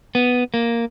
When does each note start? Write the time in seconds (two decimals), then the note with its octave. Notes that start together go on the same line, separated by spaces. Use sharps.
0.15 B3
0.54 A#3